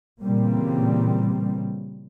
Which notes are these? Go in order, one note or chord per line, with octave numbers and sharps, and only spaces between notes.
A#2 C#3 E3 G3 A#3 C4